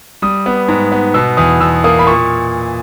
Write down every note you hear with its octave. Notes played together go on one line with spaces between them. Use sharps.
G3 D#6
B3
G#2
B3
B2 E6
E2 D#6
B2 E6
A#3 D#6
B5
A#2 C#6